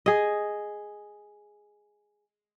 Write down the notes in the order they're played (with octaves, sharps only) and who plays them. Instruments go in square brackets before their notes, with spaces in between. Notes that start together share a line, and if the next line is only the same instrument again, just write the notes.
[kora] G#4 D#5